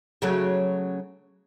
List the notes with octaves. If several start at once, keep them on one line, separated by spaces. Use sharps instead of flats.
C#3 F#3 A3